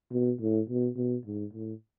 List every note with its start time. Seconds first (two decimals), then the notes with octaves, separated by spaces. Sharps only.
0.12 B2
0.40 A2
0.69 B2
0.96 B2
1.26 G#2
1.53 A2